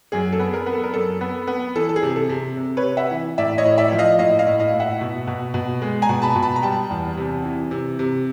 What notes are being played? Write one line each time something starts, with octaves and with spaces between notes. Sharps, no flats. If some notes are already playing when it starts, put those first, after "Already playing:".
F#2 G#4
A4
B3
G#4 A#4
B3
A4
A#4
F#2 A4
B3
B3
E3 A4
A4
G#4
C3
A4
C3
C3
B4 C#5
C3
E5 F#5
E3
A2 D5 E5
C#5 D#5
A2
D5 E5
F3
D#5 F5
A2 D#5 F5
D#5 F5
A2
D#5 F5
A2
E5 F#5
B2
B2
B2
G#3
G#5 A#5
B2
A5 B5
B2
A5 B5
A#5
G3 G5 A5
E2
C3
E3
C3
C3